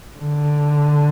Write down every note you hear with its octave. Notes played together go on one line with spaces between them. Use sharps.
D3